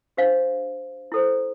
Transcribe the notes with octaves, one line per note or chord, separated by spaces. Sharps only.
D4 G4 C5 F5
E4 A4 C5